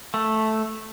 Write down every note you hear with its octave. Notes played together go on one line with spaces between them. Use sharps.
A3